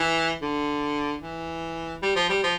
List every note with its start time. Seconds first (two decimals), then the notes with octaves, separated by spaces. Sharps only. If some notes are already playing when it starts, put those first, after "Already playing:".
Already playing: E3
0.42 D3
1.22 E3
2.03 G3
2.16 F3
2.29 G3
2.43 F3